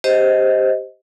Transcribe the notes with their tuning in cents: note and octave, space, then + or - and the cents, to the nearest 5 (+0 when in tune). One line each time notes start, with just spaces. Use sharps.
G4 +0 C5 +0 D#5 +15